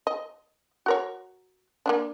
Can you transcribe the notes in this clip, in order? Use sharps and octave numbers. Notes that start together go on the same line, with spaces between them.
D#5
F#4 A#4 C#5
A#3 C#4 D4